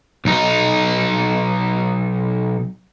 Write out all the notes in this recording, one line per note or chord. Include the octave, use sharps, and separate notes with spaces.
B1 D#4